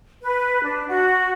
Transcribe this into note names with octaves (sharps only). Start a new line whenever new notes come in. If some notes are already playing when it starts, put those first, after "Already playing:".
B4
D4
F#4